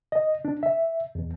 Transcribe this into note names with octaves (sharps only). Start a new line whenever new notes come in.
D#5
D4
E5
E2